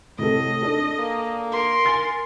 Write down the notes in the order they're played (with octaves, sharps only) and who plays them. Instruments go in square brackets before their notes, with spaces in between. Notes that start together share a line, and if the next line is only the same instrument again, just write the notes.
[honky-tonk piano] A2 C3 A4 [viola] D#5
[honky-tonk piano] D4 A4
[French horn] A#3
[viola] A#4 C6
[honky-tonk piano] G#5 A6 C#7